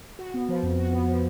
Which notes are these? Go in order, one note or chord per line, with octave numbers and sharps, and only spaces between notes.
F#4
B3
F3
F2
F#4
B3
F3